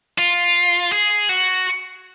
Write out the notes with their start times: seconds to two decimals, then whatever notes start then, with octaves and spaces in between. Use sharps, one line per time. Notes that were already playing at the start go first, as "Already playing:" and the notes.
0.18 F4
0.92 G#4
1.29 F#4